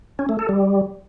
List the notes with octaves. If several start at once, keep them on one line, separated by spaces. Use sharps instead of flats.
C#4
A3
A4
G3